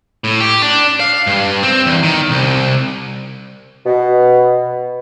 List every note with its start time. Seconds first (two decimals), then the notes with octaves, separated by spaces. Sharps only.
0.24 A2
0.40 G4
0.62 D4
1.00 F5
1.27 G2
1.63 C4
1.86 E2
2.03 D#3
2.31 C2
3.86 B2